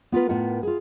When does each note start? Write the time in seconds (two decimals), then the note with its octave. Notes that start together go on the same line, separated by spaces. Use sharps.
0.12 B3 F4 A#4 B4
0.29 A2 B3 F4 A#4 F#5
0.63 F4 G#4